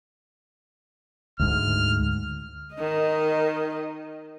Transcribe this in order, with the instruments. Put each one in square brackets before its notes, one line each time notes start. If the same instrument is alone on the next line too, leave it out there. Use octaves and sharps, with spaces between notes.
[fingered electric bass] D2 G#2 [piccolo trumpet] F6
[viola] D#3 D#5